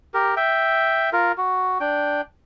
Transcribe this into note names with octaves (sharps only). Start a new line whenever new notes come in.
G4 A#4
E5 G5
F4 A#4
F#4
D4 G5